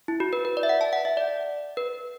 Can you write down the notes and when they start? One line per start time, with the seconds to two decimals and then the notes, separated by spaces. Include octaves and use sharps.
0.08 E4
0.20 F#4
0.33 B4
0.45 B4
0.57 D5
0.63 E5
0.69 F#5
0.81 A5
0.93 F#5
1.05 E5
1.17 D5
1.77 B4